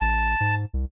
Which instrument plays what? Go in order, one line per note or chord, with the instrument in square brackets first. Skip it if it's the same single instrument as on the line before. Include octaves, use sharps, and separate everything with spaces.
[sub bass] A1 [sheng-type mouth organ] A5
[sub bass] G#2
C2